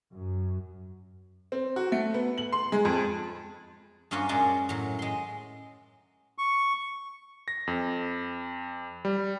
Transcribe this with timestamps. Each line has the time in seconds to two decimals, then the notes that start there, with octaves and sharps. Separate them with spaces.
0.13 F#2
1.52 C4
1.76 F#4
1.92 A3
2.14 B3
2.38 F#7
2.52 C6
2.72 G#3
2.85 F2
4.11 G2 A#3 C#4 F4 F#4
4.29 F#2 A#2 G#3 C#4 F#4 A5
4.69 A2 F#3
4.99 G#3 C6
6.38 C#6
7.48 A#6
7.67 F2
9.05 G3